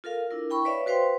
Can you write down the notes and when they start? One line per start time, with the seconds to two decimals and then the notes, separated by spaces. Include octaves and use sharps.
0.04 F4 A4 A#4 F5
0.31 D4 E4 A#4
0.50 E4 G5 B5 C#6
0.65 B4 C#5 D5 E5 F5
0.86 F#4 B4 C5 F5 G5 C6